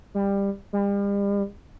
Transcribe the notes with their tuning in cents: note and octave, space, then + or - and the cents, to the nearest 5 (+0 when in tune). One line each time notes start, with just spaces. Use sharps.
G3 +20
G3 +40